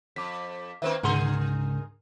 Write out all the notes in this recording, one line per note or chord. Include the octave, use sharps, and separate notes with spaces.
F2 D6 B6
D#3 A#3 C4 B4 C5 E5
C#2 G#2 D3 G#4 A#4 F#5 C6